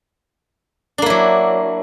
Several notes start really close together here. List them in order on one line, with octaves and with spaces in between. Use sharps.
D4 A#3 E4 F#3